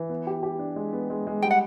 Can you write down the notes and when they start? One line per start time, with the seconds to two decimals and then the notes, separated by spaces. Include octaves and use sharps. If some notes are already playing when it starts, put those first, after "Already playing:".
Already playing: E3
0.09 B3
0.27 G4
0.43 G4
0.59 D4
0.76 G#3
0.93 B3
1.10 G#3
1.27 G#3
1.42 G3 G5
1.51 F#5